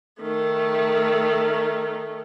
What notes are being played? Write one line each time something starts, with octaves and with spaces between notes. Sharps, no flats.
D#3 A3